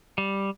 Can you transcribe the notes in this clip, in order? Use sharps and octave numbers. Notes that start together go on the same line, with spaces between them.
G3